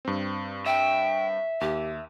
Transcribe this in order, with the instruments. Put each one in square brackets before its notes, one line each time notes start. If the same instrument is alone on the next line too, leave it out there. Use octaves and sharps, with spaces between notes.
[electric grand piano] G2 C4
[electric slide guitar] E5 [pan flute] G5
[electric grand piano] D#2 [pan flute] G4